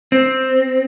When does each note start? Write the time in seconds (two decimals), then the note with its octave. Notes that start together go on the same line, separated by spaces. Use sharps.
0.12 C4